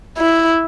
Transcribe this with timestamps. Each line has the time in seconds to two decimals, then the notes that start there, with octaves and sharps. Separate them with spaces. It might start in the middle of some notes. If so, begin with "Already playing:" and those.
0.18 E4